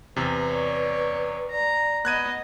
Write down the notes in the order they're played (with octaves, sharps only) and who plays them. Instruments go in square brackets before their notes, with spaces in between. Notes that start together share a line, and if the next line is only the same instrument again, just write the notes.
[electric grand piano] E2 C3 [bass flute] B4
[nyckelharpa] C#5 D5
[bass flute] D5 [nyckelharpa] A#5
[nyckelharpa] B3 D#5 [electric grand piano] F#6 G#6 D#7